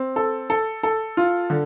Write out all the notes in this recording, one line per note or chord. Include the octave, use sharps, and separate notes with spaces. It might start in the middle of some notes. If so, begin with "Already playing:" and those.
Already playing: C4
A4
A4
A4
F4
D3